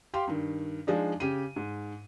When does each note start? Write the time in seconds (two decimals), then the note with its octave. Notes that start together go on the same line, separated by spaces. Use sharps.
0.14 G4 F5 G5 C6
0.28 G2 D#3
0.87 F3 G#3 D4 D#4
1.20 C#3 G4 D#7
1.56 G#2